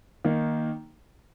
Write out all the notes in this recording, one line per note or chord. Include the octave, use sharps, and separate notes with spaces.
D#3 A#3 D#4